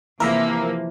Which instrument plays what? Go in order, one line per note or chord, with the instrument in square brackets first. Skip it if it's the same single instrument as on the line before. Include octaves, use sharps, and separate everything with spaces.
[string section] C3 F3 A#3 [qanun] E3 [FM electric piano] A#4 E5 A#5